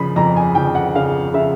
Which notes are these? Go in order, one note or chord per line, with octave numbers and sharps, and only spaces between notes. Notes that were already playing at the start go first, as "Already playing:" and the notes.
Already playing: C#3 F3 B5
F2 A#5
G#5
F3 G5
F#5
C#3 F5
C#3 E5